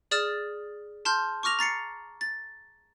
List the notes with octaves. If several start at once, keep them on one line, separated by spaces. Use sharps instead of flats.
G#4 D5 D#6 F6 A6 E7
A5 C6 F6 G6
C#6 D6 F6 A#6 F7
A#5 A6 C7 C#7
A6